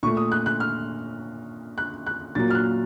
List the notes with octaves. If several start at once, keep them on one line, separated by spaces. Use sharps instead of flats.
A#2 A3 C#6
D#6
F#6
F#6
F6
F#6
F#6
A#2 F#3 A#3 A6
F6
F#6